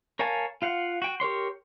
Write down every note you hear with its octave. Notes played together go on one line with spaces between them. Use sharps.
A#4 C#5 F5 G#5 A5
F4 F5 F#5
F#4 G5
G4 A#4 C#5 C6